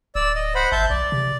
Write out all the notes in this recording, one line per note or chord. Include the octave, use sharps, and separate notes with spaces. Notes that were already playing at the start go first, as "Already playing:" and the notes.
D1 D5 E6
D#5
C5 F#5 B5
G#1 E5 A5 G6
B1 D5
C3